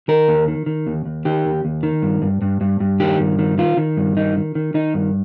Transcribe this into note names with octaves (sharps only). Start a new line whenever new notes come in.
D#3 A#4
D#2
D#3
D#3
D#2
D#2
D#3 G4
D#2
D#2
D#3
G2
G2
G2
G2
G2
D#3 G4
G2
D#3
D#3 F4
D#3
G2
D#3 D#4
D#3
D#3
D#3 D#4
G2